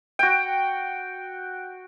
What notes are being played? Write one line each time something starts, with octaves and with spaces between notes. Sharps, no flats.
F#4 G5